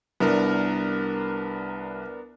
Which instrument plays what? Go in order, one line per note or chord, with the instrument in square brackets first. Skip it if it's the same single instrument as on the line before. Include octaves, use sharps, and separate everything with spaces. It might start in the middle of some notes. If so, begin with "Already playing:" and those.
[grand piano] C2 [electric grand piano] B3 D4 A#4